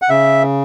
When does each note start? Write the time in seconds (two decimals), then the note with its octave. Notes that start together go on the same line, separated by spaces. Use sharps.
0.02 F#5
0.10 C#3 E5